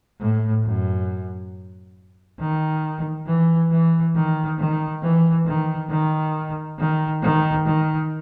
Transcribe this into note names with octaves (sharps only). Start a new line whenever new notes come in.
A2
F#2
D#3
E3
E3
D#3
D#3
E3
D#3
D#3
D#3
D#3
D#3